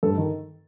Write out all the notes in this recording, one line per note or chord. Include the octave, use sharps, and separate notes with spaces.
G2 A4
D#3